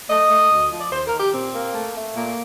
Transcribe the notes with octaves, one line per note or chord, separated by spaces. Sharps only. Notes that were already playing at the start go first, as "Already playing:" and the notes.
A3 D#5
A3
D2
F3
D5
D#2 C5
A#4
D#3
G4
A#2 C4
A#3
A3
A3
A#2 A#3